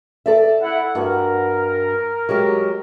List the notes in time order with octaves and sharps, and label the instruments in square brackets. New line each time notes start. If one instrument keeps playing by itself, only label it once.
[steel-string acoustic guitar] A4 D5 E5
[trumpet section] E4 F#5
[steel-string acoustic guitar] G2 F#4 F#5 [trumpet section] A#4
[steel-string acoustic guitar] F#3 G#3 G4